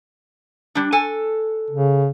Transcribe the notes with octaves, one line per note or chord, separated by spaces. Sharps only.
G3 D4
A4 G#5
C#3